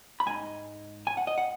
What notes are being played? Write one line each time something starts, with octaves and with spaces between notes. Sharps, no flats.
B5
G#2 G#3 D#4 G#5
G#5
F#5
D#5
F#5